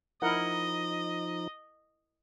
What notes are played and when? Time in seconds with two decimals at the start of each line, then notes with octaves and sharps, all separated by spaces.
0.22 F3 D#4 E4 A#4 D#5 F#5